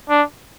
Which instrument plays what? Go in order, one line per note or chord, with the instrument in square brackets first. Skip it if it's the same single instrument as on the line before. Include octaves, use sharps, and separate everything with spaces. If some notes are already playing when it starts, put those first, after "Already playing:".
[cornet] D4